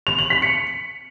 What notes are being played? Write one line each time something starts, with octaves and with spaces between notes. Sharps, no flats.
F7
F#7
B6
C#7